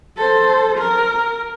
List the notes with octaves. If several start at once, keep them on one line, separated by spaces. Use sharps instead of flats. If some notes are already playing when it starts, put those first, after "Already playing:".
A4 C5
A#4